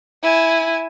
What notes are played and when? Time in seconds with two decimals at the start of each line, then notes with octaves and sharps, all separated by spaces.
0.23 E4 G#5